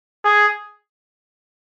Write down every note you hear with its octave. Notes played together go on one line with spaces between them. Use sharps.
G#4